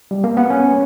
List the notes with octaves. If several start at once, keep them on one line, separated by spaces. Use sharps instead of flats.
G3
A#3
B3
C#4